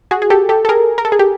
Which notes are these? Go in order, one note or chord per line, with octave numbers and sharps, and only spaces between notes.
F#4 G#4
G#4
G4 A4
G4 A4
A4
G#4 A#4
A#4
A4
G#4
G4